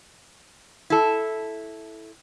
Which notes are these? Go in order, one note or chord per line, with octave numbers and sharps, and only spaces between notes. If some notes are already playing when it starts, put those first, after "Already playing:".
E4 A4